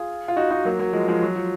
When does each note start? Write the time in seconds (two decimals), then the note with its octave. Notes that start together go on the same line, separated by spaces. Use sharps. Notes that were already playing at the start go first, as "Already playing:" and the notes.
Already playing: F4 G#4
0.28 F4
0.36 D#4 F#4
0.51 D#4 F#4
0.65 F#3 A#3
0.79 F#3 A#3
0.93 F3 G#3
1.08 F3 G#3
1.22 F#3
1.36 F3